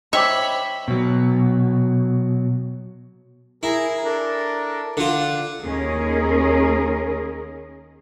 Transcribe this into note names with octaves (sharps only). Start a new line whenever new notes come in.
C5 C#5 D#5 E5 G5 B5 D6
B2 F#3
E4 G#4 A#4
D4 A4 A#4
D3 F4 F#5
D#2 C#4 G#4 A#4